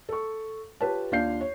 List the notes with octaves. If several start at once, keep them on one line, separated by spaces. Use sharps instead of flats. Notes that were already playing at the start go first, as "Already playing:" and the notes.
A4 C#6
F4 G4 B4 C#5 A5
D#2 D4 F4 F5 G6 C7
C#5